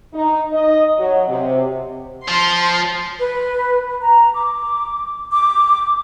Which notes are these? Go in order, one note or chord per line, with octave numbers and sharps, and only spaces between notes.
D#4
D#5
F#3
C3
F3 C6
B4
A#5
D6
D6